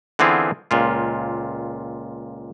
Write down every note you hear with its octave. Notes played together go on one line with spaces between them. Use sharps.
D3 E3 B3 C4 F4 G#4
C#2 A#2 F4